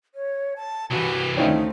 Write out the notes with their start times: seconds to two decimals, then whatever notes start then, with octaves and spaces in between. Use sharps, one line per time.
0.15 C#5
0.56 A5
0.91 C2 E3 F#4 G4 B4
1.37 D2 A3 C4 C#4 D#4 F4